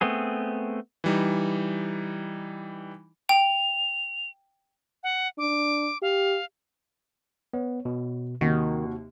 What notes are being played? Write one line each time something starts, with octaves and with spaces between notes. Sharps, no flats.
A3 B3 C4 G#4
E3 G3 D#4
G5 F7
F#5
D4 D6
G4 F5
B3 C#5
B2
D#2 C3 D#3 A#3 F#4